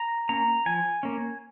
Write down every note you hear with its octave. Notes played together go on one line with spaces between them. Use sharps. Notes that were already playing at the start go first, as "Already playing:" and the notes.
Already playing: A#5
A#3 C#4 A#5
F3 G#5
A#3 C#4